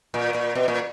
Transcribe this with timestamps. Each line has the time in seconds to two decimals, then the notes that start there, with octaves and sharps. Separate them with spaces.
0.14 A#2
0.35 A#2
0.55 B2
0.68 A#2